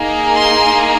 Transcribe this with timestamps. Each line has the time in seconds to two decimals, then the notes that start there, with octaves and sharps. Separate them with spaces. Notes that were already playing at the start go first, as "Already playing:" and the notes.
Already playing: A#3 D#4 G#4
0.36 C6